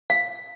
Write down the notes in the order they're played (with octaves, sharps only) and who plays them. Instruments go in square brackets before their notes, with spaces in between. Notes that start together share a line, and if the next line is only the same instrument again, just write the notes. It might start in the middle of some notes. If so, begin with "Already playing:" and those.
[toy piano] F5